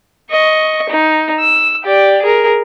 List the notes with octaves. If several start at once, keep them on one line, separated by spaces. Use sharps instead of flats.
D#5 C#6
D#4
E6
G4 D5
G#4 A#4